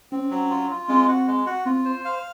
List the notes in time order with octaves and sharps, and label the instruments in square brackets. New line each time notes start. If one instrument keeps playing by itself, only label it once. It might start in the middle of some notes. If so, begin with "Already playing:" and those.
[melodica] C4 [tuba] C#4
[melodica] F#3
F4
F4
[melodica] G#3 [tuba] C4
[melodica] F#4
G#3
F#4
[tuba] C4 [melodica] F4
[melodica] C5
F5